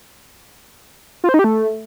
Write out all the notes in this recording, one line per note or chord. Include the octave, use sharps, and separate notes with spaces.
F4
C5
D#4
G4
A3